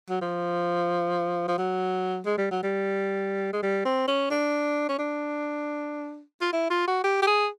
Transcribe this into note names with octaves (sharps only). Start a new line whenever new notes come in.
F#3
F3
F3
F#3
G#3
G3
F#3
G3
G#3
G3
C4
C#4
D4
C#4
D4
F4
E4
F4
F#4
G4
G4
G#4